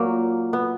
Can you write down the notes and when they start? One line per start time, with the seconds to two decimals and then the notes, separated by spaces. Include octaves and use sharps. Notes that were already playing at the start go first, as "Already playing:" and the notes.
Already playing: A#2 F#3 A#3
0.53 B3